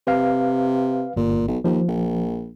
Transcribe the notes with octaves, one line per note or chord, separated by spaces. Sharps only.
C3 B4 F5
G1 A#2
B1
D#2 F3
A#1